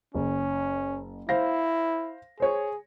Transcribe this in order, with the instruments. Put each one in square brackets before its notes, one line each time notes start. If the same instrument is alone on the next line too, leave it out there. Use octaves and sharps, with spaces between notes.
[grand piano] F#1 [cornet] C#4
[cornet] E4 [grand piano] C5 F5 A#6
[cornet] G#4 [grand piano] C5 C#5